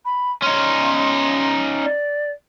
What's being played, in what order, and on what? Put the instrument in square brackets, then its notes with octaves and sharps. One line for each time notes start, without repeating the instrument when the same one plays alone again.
[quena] B5
[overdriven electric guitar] C#4 D#4 [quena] C6
[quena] D5